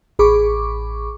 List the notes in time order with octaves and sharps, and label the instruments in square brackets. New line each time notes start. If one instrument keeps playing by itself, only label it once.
[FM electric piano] A1 G#4 B5 C#6 D6